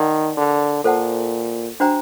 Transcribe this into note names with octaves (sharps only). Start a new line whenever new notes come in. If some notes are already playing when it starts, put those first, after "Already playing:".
Already playing: D#3 A#4 D5 F#5 A5 C6
D3
A#2 A4 C5 F#5 A5
D4 F#4 C5 G5 A#5